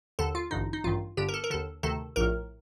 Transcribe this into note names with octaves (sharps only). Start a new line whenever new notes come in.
D#2 D3 A4
F4
A1 G2 D3 D#4
D#4
A1 G2 D#3 F4
G1 G2 D3 G4
A#4
A4
A#4
D#2 D3 A4
D2 C3 D#3 A4
A#1 A2 A#4